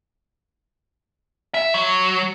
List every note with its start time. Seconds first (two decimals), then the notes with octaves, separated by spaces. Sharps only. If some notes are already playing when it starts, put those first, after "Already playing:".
1.54 E5
1.74 F#3